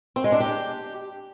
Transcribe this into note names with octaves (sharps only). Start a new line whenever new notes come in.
C4
G#3
D4
G4